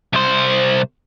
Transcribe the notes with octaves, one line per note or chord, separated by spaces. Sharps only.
C2 C5